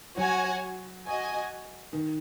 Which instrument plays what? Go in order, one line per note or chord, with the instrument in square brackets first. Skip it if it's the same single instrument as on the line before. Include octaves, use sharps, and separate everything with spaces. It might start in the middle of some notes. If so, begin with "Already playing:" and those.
[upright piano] F#3 [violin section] F#4 C#5 G#5
[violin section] F#4 D#5 G#5
[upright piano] D#3